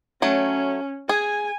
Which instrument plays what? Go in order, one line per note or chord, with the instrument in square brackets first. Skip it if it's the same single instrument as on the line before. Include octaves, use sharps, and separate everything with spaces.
[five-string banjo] F#3 A3 [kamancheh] C#4
[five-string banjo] G#4 [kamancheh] G#5